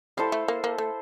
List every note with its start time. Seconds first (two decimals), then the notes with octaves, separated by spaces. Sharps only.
0.17 G3 E4 A4 C5 F5
0.32 A3
0.48 A#3
0.64 A#3
0.78 A3